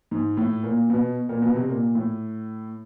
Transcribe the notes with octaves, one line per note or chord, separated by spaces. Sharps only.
G#2
A2
A#2
B2
A#2
B2
C3
A#2
A2